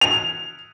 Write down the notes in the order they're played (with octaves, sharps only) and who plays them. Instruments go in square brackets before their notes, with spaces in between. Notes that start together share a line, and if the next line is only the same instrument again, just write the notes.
[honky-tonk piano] F7